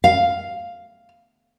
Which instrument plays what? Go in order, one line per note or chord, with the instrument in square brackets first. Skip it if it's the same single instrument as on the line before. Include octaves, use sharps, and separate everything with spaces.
[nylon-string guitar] F5